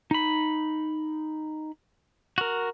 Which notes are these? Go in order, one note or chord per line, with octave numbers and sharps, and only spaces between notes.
D#4 B5
F#4 A#4